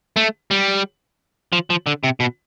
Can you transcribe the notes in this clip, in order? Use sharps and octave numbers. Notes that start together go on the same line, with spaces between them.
A3
G3
F3
F3
D3
C3
B2